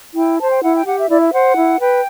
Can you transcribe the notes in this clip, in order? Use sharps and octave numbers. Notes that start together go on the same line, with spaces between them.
E4 G5
C5 A5
G5
E4 F#5
G5
G4 F#5
E5
E4 D5
E5
C5 F#5
E4
B4 G5